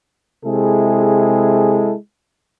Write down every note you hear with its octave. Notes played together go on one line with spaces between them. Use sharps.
C3 G#3 E4 G#4 A4